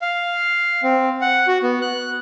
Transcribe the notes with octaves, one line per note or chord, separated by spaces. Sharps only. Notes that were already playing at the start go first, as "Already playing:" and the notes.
F5
C4
F#5
F#4
B3
F#6